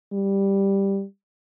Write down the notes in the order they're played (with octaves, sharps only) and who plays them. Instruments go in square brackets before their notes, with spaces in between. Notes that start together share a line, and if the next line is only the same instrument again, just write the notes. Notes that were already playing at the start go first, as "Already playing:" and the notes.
[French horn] G3